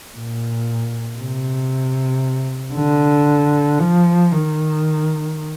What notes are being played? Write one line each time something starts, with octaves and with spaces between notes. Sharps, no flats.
A#2
C3
D3
F3
D#3